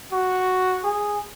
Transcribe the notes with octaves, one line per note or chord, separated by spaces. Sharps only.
F#4
G#4